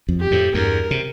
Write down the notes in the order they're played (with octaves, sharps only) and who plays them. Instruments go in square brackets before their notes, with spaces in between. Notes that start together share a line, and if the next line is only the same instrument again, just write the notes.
[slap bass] F2
[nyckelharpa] G4
[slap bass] F2 A2
[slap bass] E2 G2 [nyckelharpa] A#4
[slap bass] C3